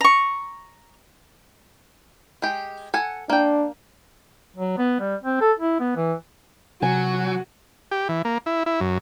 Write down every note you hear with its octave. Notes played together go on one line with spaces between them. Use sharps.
A#5 C#6
G#3 G4
A4 F#5 G#5
A#3 D4 G5
F#3
B3
G3
C4
A4
E4
B3
E3
C3 F#3 F#4 G#5
G4
E3
A#3
E4
E4
F#2